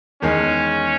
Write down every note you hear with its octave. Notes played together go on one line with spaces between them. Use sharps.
E2 D#3 G#3 C#4